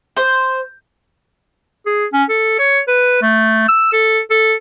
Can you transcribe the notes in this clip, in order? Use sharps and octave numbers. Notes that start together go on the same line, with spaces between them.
C5
G#4
C#4
A4
C#5
B4
A3
E6
A4
A4